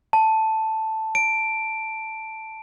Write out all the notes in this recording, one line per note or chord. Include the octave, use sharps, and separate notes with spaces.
A5
D7